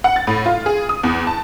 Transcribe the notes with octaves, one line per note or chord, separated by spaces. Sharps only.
F#5
A6
A2
F4
G#4
D#6
E2
A5